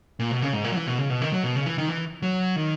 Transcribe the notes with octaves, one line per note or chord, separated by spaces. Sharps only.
A#2
B2
C#3
G#2
A#2
F#3
E3
B2
C#3
B2
D#3
F#3
B2
C#3
E3
D#3
E3
F#3
D#3